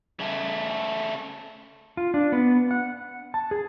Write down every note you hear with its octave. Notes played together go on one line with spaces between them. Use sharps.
C#3 A3
F4
D4
B3
F#5
A5
G#4